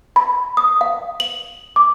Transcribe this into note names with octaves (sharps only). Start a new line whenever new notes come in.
B5
D#6
F5
F#7
D6